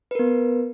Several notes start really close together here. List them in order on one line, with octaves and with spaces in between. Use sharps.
B4 A#4 B3